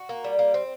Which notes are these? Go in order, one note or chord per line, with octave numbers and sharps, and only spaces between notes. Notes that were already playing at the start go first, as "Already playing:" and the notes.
Already playing: F#4
A#3
G3
A#3
C4